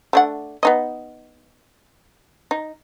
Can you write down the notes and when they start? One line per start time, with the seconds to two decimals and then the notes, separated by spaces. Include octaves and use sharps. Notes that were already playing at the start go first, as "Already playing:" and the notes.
0.13 A3 D4 F#5
0.63 B3 D#4 D#5
2.51 D#4